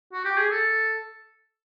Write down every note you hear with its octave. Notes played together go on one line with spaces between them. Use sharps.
F#4
G4
G#4
A4